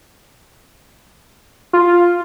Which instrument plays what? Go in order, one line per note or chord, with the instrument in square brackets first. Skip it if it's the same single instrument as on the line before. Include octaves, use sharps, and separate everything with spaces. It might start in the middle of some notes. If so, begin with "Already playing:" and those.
[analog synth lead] F4